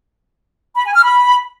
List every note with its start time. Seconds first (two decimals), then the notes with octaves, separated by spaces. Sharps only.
0.76 B5
0.85 G#5
0.94 F6
1.03 B5